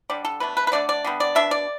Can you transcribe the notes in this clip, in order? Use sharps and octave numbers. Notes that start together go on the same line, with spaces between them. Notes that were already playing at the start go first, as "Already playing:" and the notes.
D3 G3 D4 D5
A4
B2 A3 D4 B4
B4
B4
D3 A3 D4 D5
D5
D3 G3 B3
D5
B2 B3 D4 E5
D5